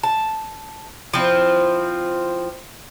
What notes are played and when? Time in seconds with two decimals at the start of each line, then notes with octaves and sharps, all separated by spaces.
0.03 A5
1.13 F3 C4 E4